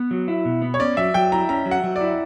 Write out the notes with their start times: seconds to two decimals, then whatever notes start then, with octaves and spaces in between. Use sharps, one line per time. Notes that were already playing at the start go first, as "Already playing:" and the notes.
Already playing: B3
0.11 F#3
0.28 E4
0.45 B2
0.62 B3
0.74 C#5
0.80 C#4 D5
0.97 F#3 E5
1.14 F#3 G5
1.32 E4 A#5
1.49 C#4 A#5
1.66 F#3
1.71 F#5
1.84 F#3
1.96 D5
2.01 E4